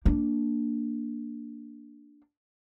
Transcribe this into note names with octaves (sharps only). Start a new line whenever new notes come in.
A#3 D4